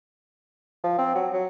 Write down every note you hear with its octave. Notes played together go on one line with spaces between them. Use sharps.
F3
C4
F#3
F#3